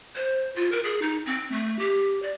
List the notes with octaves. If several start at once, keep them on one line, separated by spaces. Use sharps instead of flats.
C5
F4
A#4
G#4
D#4
C4
A3
G4
D5